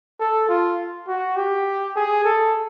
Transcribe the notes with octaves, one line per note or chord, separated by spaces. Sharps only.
A4
F4
F#4
G4
G#4
A4